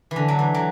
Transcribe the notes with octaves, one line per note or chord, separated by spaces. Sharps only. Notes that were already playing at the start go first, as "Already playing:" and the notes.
E3
D3
F#3
E3
F#3